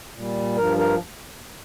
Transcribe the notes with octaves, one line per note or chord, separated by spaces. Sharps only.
A#2 G3
G2 F3 A#4
A#4